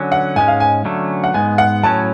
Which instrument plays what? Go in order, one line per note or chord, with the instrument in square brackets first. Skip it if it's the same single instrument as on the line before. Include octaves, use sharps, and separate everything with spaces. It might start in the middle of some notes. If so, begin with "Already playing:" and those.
Already playing: [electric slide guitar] D3 F#3 C#4
[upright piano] F#5
[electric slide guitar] G#2 G#3 C#4 [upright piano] G#5
[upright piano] F5
G#5
[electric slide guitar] D3 F#3 A3 C#4
[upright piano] F#5
[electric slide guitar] G#2 G#3 B3 [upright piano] G#5
[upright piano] F#5
[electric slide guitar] A2 F#3 C#4 [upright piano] A5